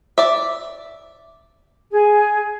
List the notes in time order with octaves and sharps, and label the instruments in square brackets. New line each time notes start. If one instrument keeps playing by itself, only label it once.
[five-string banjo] D5 E5
[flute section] G#4